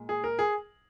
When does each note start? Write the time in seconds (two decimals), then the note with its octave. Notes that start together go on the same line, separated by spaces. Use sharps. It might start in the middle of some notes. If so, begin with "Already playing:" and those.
Already playing: A#2 G#3
0.09 G#4
0.24 A#4
0.39 G#4